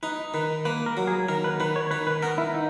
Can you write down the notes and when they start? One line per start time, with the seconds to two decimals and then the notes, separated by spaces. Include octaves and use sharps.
0.03 D#4 B4
0.34 D#3 B4
0.65 A#3 B4
0.86 A#4
0.97 F#3
1.07 G#4
1.28 D#3 A#4
1.44 B4
1.60 D#3 B4
1.76 C#5
1.91 D#3 B4
2.07 B4
2.22 B3 A#4
2.38 E4
2.54 D#4